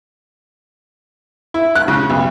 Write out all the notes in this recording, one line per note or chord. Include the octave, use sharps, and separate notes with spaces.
E4
F#6
C#3
B1